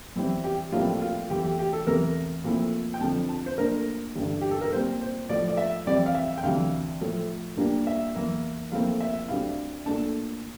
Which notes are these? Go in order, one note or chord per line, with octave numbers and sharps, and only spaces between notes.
E2 E3 G3 C4 E4
G4
A#1 A2 G3 C4 E4 F4
F4
E2 E3 A3 G4
G4
G4
A4
E2 C3 E3 A3 A#4
A#2 F3 A3 C4 E4
G5
F2 D3 F3 A5
A5
C5
A#2 A3 D4 A#4
A1 G2 D3
G4
A4
A#4
A#2 G3 C4 C5
C5
A2 F3 A3 D5
D5
E5
F2 E3 G3 C4 E4 D5
F5
E5
G5
D2 C3 E3 F5
A2 F3 A3
A#2 G3 A#3 D4
E5
E2 E3 A#3
A#1 A#2 A3 C4 E4 F5
E5
D2 D3 G3 C4 E4 F5
A#2 A3 D4 A5